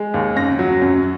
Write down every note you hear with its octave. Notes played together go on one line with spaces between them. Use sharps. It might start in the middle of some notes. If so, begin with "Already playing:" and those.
Already playing: G#3
D#2
F#2 A#6
F#3
F#2